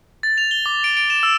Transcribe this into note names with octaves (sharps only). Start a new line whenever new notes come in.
A6
F7
G7
D6
D7
D7
E7
E6